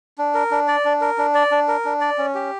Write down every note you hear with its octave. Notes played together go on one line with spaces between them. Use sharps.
D4
A#4
D4
D5
D4
A#4
D4
D5
D4
A#4
D4
D5
C#4
G4